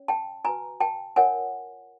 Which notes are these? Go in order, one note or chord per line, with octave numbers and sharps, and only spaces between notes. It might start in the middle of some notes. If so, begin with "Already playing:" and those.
Already playing: C#4 C#5
G5 A5
F#4 B4 G#5 A#5
G5 A5
F4 A#4 C#5 F#5 G#5